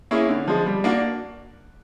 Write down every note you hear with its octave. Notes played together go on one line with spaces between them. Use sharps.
A#3 C#4 E4 G#4
D3
F3 G#3
G3
A#3 D4 F#4